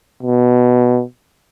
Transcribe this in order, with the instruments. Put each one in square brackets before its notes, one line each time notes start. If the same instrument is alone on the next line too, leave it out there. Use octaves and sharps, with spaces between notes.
[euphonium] B2